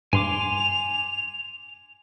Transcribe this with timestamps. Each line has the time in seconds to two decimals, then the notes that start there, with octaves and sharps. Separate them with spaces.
0.13 G2 G#5 C6 D6 F7